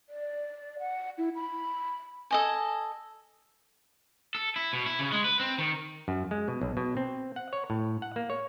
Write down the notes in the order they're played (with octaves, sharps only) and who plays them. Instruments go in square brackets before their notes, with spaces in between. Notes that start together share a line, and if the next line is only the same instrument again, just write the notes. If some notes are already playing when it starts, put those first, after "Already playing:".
[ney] D5
F#5
E4
B5
[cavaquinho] A4 D#5 G#5
[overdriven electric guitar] A4
E4
B2
E4
C#3
G#3
B4
C4
D#3
[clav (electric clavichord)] F#2
G#3
B2
B1
B2
C4
F#5
C#5
A2
F#5
A#3
C#5